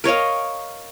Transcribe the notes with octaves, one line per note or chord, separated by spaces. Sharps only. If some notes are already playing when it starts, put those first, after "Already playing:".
A#4 C#5 D#5 F5